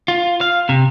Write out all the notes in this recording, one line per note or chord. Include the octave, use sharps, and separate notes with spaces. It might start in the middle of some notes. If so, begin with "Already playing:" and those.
F4
F5
C3